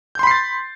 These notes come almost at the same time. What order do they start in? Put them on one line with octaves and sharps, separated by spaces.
G6 C6 B5 C7 A6